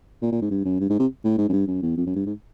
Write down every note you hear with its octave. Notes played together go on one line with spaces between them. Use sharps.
A#2
A#2
G#2
G2
F#2
G2
G#2
C3
A2
G#2
F#2
G2
F#2
E2
F2
F#2
G2
G#2